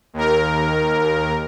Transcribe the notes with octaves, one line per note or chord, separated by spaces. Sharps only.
D#2 A#4